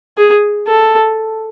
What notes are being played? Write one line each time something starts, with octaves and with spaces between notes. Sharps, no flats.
G#4
A4